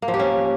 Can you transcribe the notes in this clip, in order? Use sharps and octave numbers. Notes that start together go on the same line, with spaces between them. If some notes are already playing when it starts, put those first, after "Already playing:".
A#3
F3
G4
C#4